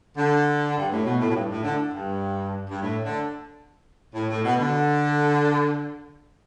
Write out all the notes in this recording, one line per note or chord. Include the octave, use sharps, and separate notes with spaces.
D3
G2
A2
B2
A2
A2
G2
A2
D3
G2
G2
A2
D3
A2
A2
B2
D3